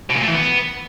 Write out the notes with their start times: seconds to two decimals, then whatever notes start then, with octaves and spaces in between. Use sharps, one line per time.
0.10 B2
0.16 A#2
0.22 A3
0.28 E3
0.34 B3